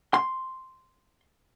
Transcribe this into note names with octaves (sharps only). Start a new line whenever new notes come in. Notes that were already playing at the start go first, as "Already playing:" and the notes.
C6